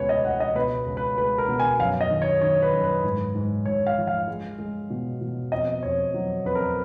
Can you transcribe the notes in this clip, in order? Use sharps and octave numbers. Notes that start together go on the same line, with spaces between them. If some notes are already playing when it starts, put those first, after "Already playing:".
Already playing: C#2 B2 C#4 B4 C#5
D#5
C#2 F#5
D#5
B2 B4
C#2
B4
G#3 B4
A#4
B2
G#5
F#2 F5
D#5
D#3
C#5
D#3 C#5
B4
F#2
B4
G#2
G#2
G#2 C#5
F5
F3
F5
G#3
G#3
B2
B2
F2 D#5
F2 C#5
F#3
F2 B4
A#4